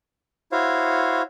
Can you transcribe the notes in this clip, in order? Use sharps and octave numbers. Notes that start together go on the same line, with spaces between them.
E4 F#4 C5 C#5 F5